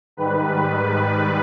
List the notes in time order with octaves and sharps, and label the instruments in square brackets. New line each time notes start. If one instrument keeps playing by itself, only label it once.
[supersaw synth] G#2 D#3 G3 B4